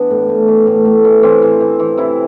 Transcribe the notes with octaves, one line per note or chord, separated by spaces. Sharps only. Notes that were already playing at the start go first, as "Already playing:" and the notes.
Already playing: E3 B3 D4
A2
A2
E3
A2
A2
E3
E3 C4
E3
E3
E3
C3 E4